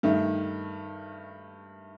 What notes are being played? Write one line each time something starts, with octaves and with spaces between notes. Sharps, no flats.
G2 D#3 A3